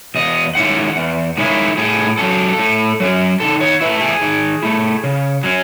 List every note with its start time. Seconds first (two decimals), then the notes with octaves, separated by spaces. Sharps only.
0.15 E2 D#5
0.55 D#3 G#3 C#4 E4 F#5
0.96 E2
1.38 D#3 G#3 C#4 E4
1.77 A2 G#4
2.18 F#3 C#4 A4
2.59 A2
3.00 F#3 C#4
3.40 D#3 A4
3.60 C#5
3.81 A3 E4 B4
4.01 G#4
4.21 D#3
4.62 A3 E4
5.04 C#3
5.43 F#3 C#4